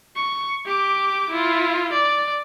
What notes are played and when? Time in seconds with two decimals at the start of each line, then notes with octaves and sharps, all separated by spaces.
0.16 C#6
0.66 G4 D6
1.30 E4 F4
1.92 D5